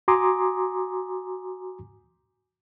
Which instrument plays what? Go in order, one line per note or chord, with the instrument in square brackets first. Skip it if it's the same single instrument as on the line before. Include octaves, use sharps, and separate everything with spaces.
[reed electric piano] F#4 G#5 A#5 C6 D6 D#6